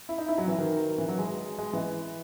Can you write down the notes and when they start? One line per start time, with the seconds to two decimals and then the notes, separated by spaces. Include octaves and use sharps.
0.09 E4
0.18 D#4
0.28 E4
0.38 F#3
0.48 E3
0.58 D#3
0.98 E3
1.08 F#3
1.18 G#3
1.58 G#3
1.73 E3